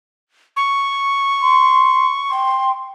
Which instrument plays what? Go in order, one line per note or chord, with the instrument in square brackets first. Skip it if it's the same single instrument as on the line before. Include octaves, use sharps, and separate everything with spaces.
[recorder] C#6
[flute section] C6
G5 C6